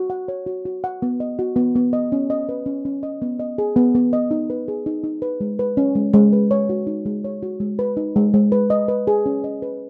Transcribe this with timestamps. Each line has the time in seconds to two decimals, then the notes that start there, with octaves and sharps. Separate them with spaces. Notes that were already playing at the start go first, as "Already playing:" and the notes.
Already playing: F#4
0.10 F#5
0.28 C#5
0.47 F#4
0.65 F#4
0.84 F#5
1.02 B3
1.20 D#5
1.39 F#4
1.56 B3
1.76 B3
1.93 D#5
2.12 C#4
2.30 D#5
2.49 B4
2.66 C#4
2.85 C#4
3.03 D#5
3.22 B3
3.39 D#5
3.58 G#4
3.76 B3
3.95 B3
4.13 D#5
4.31 D#4
4.50 B4
4.68 G#4
4.86 D#4
5.04 D#4
5.22 B4
5.41 G#3
5.59 B4
5.77 C#4
5.95 G#3
6.13 G#3
6.33 B4
6.51 C#5
6.69 F#4
6.87 D#4
7.06 G#3
7.24 C#5
7.43 F#4
7.60 G#3
7.79 B4
7.97 D#4
8.16 G#3
8.34 G#3
8.52 B4
8.70 D#5
8.88 B4
9.07 G#4
9.26 C#4
9.44 D#5
9.62 B4